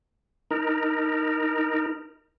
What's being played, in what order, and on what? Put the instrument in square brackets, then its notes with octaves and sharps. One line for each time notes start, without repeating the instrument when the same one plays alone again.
[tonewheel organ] D#4 A#4